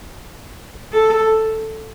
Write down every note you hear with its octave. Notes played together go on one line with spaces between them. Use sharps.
A4